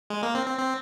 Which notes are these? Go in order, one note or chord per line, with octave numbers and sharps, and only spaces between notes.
G#3
A#3
C4
C4
C4